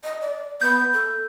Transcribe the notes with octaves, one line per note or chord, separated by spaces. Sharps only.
D#5
D5
B3 G6
A4